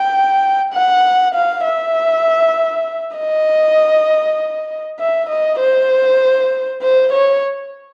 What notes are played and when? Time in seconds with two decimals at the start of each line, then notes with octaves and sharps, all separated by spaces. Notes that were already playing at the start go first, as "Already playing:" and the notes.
Already playing: G5
0.73 F#5
1.34 F5
1.64 E5
3.17 D#5
5.00 E5
5.29 D#5
5.59 C5
6.82 C5
7.12 C#5